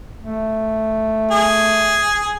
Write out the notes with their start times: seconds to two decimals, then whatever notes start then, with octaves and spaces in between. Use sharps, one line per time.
0.22 A3
1.31 G#4